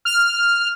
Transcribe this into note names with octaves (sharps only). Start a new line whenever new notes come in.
F6